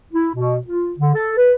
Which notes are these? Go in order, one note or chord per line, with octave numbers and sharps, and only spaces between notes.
E4
B2
F4
D3
A4
B4